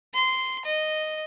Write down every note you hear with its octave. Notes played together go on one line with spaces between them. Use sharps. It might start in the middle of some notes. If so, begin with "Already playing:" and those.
C6
D#5